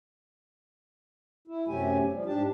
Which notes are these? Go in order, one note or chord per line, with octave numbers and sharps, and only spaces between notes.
E4
F#2 C3 F#3 A3 G4 G#5
F3 G3
G#2 D4 G4 A5